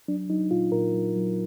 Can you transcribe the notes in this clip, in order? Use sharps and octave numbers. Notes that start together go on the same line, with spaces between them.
F#3 D4
F#3 D#4
A#2 F4
A#2 A#4
F#3
F#3